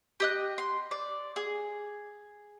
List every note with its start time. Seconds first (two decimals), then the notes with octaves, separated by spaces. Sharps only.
0.20 G4 D#5 F#6
0.58 C6
0.91 D5
1.36 G#4